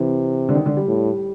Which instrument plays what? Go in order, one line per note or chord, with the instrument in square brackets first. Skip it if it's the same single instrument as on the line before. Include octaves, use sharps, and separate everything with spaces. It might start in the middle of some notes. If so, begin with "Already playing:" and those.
Already playing: [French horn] C3 [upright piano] E3
[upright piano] D3
D#3
D3
G3
[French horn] A2